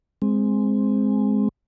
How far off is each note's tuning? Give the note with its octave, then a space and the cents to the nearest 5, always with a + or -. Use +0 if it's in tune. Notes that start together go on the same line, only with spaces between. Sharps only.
G#3 +0 C4 +0